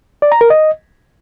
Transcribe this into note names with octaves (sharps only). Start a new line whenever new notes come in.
D5
A#5
A#4
D#5